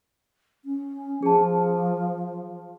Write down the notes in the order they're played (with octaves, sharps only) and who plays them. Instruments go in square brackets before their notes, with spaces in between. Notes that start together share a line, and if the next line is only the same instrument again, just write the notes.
[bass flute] C#4
[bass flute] F3 [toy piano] G#4 A5